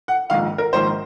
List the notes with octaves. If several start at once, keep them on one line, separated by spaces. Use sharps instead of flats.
F#5
A#1 G#2 D#3 F5
A#4
A#1 G#2 D#3 C5